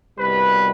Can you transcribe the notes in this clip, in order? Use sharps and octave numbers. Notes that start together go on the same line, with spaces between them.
C2 B2 G3 B4